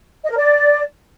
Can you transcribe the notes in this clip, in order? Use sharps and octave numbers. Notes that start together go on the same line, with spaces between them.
D#5
A#4
D5